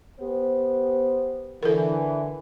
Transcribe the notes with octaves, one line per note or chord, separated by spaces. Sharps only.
B3 G4 C5
D3 E3 A4 A#4